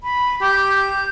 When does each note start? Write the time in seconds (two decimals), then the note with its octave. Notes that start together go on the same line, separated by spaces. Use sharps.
0.03 B5
0.41 G4 G6